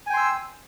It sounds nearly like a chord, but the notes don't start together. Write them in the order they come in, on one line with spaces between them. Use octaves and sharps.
G#5 G5 C6 E6